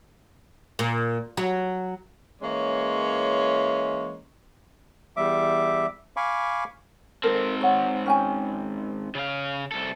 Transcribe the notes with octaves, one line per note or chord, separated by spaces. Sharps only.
A#2
F#3
E3 G#3 A#3 C#4 C#5
E2 G3 E5 D6
F5 G#5 B5 C#6 D6
G#2 C4 A4 A#4
C#5 F#5
C#4 G5 G#5
C#3 F5
C2 A4